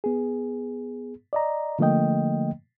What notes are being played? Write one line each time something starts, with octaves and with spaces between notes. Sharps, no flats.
B3 G#4
D5 D#5 A#5
D3 F3 A3 A#3 D#5 G5